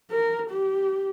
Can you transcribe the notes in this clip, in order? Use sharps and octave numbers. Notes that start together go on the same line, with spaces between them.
A#4
G4